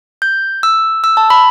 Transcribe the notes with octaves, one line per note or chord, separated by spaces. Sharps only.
G6
E6
E6
A5
B5